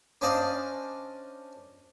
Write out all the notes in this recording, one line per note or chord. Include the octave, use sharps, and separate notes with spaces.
C#4 D4 C5 D5 D#5 F5